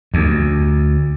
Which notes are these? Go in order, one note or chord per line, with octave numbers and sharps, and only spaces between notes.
D2